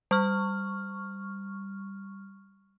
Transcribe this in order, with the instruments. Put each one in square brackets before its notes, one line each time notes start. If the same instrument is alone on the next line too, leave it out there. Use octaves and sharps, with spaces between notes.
[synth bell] G3 C#6 F6